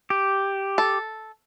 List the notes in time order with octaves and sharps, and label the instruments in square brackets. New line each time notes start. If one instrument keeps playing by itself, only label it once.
[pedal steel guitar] G4
[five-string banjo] A4